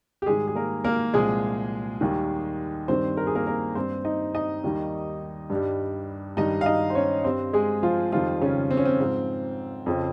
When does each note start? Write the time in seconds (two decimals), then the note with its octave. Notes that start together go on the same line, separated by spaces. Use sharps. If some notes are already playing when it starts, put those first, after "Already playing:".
0.22 G4
0.26 G#2 D#3 G3 G#3 G#4
0.48 G#4
0.55 A#3 A#4
0.84 A#3 A#4
1.14 C2 A#2 F3 G#3 G#4
2.01 D#2 D#3 G3
2.88 G2 D#3 G3 C4 C5
3.17 A#4
3.27 G#4
3.35 A#3 A#4
3.47 A#3 A#4
3.75 G2 G3 C4 C5
4.05 D#4 D#5
4.34 D#4 D#5
4.64 D#2 D#3 G3
5.50 G2
5.55 G3
6.37 G2 D#3 G3 D#4 D#5
6.61 F5
6.66 D#4 D#5
6.90 C5
6.95 C#4 C#5
7.24 G2 G3 C4 C5
7.53 G#3 G#4
7.83 F3 F4
8.12 F2 D#3 F3 G3 F4
8.41 C#3 C#4
8.71 C4
8.77 C#4
8.85 C4
9.00 G#2 F3
9.86 F2 C#3 F3